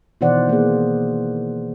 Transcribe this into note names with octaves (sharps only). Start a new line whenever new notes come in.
B2 D#3 E3 C5 D5 F#5
A#3 G#4